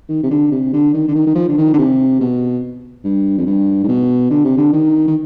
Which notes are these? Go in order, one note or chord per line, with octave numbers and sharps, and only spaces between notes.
D#3
C3
D3
C3
D3
D#3
D3
D#3
D#3
F3
D3
D#3
D3
C3
B2
G2
F2
G2
G#2
B2
D3
C3
D3
D#3
D#3